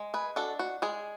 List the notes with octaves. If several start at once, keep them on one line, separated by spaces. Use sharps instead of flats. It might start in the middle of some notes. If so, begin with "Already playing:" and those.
Already playing: G#3
G#4 B4
D4 F#4 A4
F#4
G#3 G#4